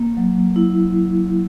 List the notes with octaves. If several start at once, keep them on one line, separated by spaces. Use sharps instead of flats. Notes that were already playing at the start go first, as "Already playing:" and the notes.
Already playing: A#3
F#3
E4